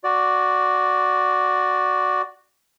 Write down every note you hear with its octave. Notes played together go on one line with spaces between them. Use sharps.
F#4 D5